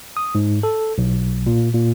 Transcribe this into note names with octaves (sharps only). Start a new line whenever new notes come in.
D#6
G#2
A4
B1
A#2
A#2